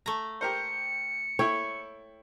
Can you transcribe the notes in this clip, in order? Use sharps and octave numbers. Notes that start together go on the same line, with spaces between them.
A3 A#5
G4 A#4 C5 C#7
E4 A4 C#5 G5